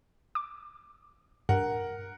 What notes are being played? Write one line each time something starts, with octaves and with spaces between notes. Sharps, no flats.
D6
G2 A#4 F#5